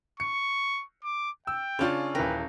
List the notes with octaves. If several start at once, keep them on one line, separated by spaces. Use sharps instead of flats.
C#6 C#7
D6
G5 E6
C#3 C#4 D4 F4 C#5
D#1 E3 A#4 B4 G5